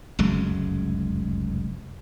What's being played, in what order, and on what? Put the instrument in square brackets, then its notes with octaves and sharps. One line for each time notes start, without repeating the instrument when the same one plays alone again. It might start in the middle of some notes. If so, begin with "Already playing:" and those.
[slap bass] F1 C#2 F#2 G#3